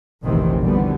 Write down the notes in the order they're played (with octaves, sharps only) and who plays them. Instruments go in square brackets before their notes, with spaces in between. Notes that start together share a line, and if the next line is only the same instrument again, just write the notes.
[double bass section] F1 A#1 C3 D#3 E3 C4
B2 D3 E3 G3 B3